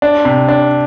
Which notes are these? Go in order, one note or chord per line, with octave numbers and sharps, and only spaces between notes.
D4
C3
D4